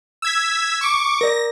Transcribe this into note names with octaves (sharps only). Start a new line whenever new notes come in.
E6 G#6 B6
C#6 D6
A#4 D5 A#6